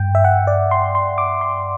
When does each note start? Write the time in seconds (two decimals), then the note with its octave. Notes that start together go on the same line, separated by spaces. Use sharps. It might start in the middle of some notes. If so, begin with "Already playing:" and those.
Already playing: G2 G5
0.15 E5
0.25 F#5
0.47 D5
0.71 C6
0.95 C6
1.18 D6
1.41 C6